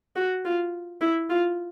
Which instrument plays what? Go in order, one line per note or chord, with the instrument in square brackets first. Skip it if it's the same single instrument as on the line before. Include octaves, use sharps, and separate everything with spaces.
[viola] F#4
F4
E4
F4